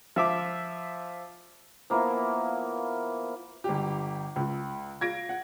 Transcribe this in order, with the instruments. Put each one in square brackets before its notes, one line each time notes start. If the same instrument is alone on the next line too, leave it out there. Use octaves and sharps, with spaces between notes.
[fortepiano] F3 E5 D6
[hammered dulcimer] F3 A#3 B3 E4
[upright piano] G1 G4
C#2
F4 G#6 A#6 D7
F#5